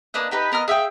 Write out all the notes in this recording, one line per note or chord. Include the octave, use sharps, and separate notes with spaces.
A#3 D4 B4 D#5
D#4 G4 B4
B3 A#4 D#5 F6
G#4 E5 F5 G5